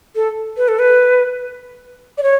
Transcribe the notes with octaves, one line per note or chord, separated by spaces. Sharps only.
A4
B4
A4
B4
D5
C#5